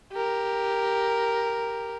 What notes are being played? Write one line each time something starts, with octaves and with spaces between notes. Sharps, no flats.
G4 A#4